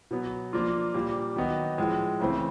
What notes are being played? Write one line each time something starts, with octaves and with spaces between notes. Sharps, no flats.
B2 F#3 B3
F3 A#3 D4 F4
A#2 G3 A#3 D4
D#3 F#3 B3 D#4 F#4
A2 F3 G#3
C#3 E3 A3 C4